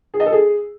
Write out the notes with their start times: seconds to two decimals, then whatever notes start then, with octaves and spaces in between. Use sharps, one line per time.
0.14 G#4
0.20 D#5
0.26 A4
0.32 G#4